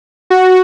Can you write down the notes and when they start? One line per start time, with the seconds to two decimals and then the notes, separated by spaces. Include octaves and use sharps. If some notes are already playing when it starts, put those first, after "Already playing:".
0.30 F#4